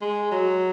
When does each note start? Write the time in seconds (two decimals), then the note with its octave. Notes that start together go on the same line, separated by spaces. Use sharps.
0.01 G#3
0.32 F#3